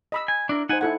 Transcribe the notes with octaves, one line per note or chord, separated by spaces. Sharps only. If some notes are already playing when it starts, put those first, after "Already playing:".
D#5 B5 E6
G#5
D4 E4 A#4
D#4 C5 F#5 G#5
E4 A4 F#5 G#5